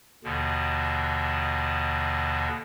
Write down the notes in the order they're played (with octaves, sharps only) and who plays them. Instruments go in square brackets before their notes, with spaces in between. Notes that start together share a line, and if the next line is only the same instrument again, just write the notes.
[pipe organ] D#2 B2 D3